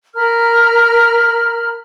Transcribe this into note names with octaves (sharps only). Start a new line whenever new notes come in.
A#4 A#5 B5 F6